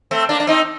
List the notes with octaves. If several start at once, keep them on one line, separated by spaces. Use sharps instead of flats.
A3 C4
A#3 D4
D4
C4 D#4